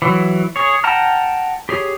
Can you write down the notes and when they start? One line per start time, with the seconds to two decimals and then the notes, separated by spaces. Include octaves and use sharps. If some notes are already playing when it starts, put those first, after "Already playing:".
0.02 E3 F#3
0.56 G#4 C#5
0.84 F#5 G5 A5 A#5 F6
1.69 G4 G#4 C#5